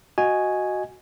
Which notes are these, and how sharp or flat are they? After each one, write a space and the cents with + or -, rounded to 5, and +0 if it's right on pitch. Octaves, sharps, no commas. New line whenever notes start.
F#4 +0 D#5 +0 G#5 +0